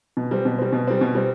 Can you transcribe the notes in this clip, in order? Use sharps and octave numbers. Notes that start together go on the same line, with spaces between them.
B2
G3 C4
B2
G3 C4
B2
G3 C4
B2
G3 C4